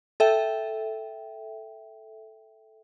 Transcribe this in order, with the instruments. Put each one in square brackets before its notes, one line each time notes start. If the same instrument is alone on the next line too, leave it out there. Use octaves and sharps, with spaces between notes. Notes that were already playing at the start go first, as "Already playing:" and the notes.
[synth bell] A4 E5 G5